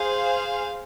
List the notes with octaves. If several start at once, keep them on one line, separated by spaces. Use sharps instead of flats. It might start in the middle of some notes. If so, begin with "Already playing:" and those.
Already playing: G#4 C5 F5